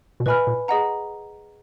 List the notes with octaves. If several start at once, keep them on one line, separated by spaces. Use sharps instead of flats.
B2
A#2 B4 D#5 G#5 B5 F6
A#2
G#4 D#5 F#5 A#5